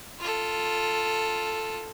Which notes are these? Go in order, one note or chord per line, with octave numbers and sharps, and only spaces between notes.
F4 A4